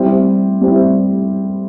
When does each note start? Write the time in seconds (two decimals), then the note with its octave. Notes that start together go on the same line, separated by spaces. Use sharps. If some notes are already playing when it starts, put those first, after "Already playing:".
Already playing: G3 C4 E4
0.61 G3 C4 E4